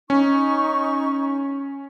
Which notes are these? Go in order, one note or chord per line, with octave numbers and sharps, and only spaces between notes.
C#4 D#4 C#6